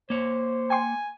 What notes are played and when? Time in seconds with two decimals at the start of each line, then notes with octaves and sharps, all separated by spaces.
0.10 A#3 C5 C#5
0.70 G5 G#5 C6